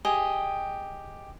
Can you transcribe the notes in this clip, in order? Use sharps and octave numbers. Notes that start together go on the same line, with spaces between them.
G4 G#4 D#5